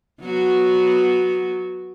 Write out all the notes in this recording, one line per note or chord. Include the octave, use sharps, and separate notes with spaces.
F#3 B3 F#4